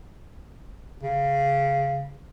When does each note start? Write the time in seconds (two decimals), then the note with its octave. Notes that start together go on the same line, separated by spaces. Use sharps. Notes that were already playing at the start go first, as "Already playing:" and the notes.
1.03 C#3